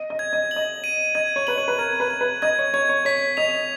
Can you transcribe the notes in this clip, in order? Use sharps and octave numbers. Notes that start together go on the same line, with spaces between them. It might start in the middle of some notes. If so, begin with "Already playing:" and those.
Already playing: D#5
D#5
G#6
D#5
F#7
D#5
D#7
D#5 G#6
C#5
B4 F#7
C#5
B4
A#4 G#6
B4
G#6
B4
D#5 G#6
C#5
C#5 G#6
C#5
C#5 B6
D#5 F7